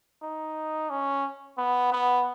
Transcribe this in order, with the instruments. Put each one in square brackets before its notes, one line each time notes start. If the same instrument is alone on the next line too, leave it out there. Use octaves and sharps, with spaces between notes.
[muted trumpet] D#4
C#4
B3
B3